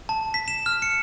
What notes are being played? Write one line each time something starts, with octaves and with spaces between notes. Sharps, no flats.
A5
B6
E7
F6
C#7